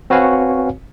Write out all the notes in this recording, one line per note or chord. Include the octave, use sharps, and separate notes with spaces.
C4 F#4 B4 C#5 F5 G#5